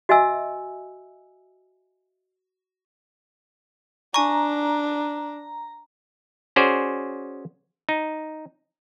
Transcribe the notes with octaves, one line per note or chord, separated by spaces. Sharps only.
F#4 D#5 E5 G#5 E6
D4 G#5 A#5 C#6
C#4 F#4 G#4 C5 D5
D#4